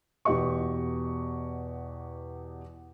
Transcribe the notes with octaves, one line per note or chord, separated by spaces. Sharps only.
E2 B2 G4 D#5 C#6